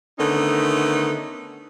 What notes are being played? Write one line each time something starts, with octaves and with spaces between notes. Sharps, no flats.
D3 D#3 A3 B3 C#4 D#4